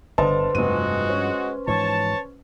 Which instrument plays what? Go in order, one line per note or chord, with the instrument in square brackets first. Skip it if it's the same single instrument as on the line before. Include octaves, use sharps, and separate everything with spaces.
[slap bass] G1 [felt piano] D3 D#5 A5 [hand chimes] B4 C5 C6
[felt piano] F1 D#7 [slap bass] G2 F3 [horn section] G#3 F#4
[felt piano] C#4
[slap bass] G#2 E3 F3 [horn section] C#5 A5